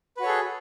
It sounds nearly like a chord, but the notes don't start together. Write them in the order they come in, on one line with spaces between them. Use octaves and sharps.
B4 F#4 C#5 A4 G#4